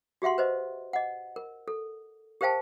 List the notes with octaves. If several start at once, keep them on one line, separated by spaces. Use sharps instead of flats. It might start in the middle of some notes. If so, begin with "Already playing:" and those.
F#4 G4 E5 F#5 C6
B4 C5 D#5
D#5 F#5
A#4
A4
G4 A#4 C5 F5 G5 A5